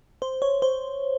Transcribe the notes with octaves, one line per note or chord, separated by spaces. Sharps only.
C5
C#5
C5